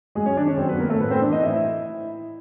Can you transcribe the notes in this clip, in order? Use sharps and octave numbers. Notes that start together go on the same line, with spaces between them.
F#2 G#3 G#4
C#4 C#5
D#3 D4 D5
C#4 C#5
F#2 C4 C5
B3 B4
D#3 A#3 A#4
A3 A4
A2 B3 B4
C4 C5
E3 D4 D5
D#4 D#5
A2 E4 E5